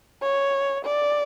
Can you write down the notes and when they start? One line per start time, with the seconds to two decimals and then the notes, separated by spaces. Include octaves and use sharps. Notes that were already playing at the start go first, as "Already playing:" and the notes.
0.22 C#5
0.84 D5